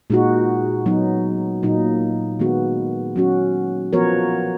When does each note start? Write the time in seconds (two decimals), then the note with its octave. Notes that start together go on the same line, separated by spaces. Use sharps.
0.10 A#2 G#3 D#4 F#4
0.86 F#3 B3 D#4
1.63 A#2 F#3 A#3 D#4
2.39 D#3 G#3 B3 F#4
3.16 F#3 C#4 F#4
3.93 F3 B3 F#4 A#4 C#5